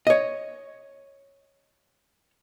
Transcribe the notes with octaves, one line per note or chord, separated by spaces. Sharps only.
C#5 D#5